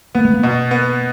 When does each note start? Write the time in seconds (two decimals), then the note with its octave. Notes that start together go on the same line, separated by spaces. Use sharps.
0.15 A#3 B3
0.25 A3
0.34 A#3
0.43 B2
0.71 B3